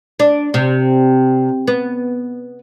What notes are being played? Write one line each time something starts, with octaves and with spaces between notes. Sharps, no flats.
D4
C3
B3